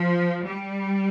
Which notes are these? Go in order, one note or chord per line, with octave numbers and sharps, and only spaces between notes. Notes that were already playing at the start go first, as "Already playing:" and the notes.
Already playing: F3
G3